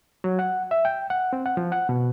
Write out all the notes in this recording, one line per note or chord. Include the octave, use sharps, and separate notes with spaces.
F#3
F#5
E5
G5
F#5
C4
F#5
F3
F#5
B2